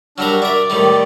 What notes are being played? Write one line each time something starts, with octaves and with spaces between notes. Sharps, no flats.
F#3 G3 D4 A#4 E6 F6
A#4 D5 E5
A2 D#3 G3